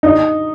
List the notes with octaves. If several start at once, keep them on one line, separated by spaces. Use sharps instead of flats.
D#4